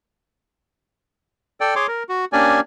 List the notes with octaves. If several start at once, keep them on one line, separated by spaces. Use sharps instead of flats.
A4 D5 G5
G#4 C#5 C6 D6
A#4
F#4
A#3 C#4 D4 G4 D5 G#5